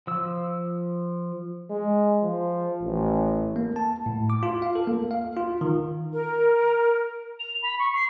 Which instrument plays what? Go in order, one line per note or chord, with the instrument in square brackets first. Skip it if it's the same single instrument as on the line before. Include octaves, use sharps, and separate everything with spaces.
[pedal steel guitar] F3 E6
[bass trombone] G#3
F3
A1
[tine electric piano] A#3
A5
A2
D6
F4
F5
A4
A#3
F5
F4
D#3
[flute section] A#4
[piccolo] F7
B5
C#6
C7